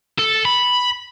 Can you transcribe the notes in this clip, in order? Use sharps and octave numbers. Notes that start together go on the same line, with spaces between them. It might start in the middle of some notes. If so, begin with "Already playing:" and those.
A4
B5